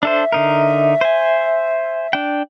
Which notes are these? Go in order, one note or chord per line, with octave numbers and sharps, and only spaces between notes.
D4 A4 C5 E5
D3 D#4 A#4
C5 G#5
D4 G5